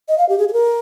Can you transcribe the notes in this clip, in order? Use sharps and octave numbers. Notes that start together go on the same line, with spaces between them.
D#5
F5
G4
G#4
G#4
A#4